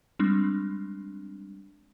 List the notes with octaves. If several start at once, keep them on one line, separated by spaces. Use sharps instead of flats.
G3 G#3 C4 D4